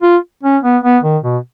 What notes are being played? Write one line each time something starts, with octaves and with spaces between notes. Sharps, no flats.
F4
C#4
B3
B3
D#3
B2